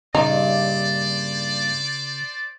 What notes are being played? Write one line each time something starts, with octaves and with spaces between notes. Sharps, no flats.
G2 A#2 C#3 D#4 C5 D5